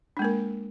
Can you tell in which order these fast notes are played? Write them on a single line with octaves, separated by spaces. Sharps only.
D4 G#3 A#3 A#4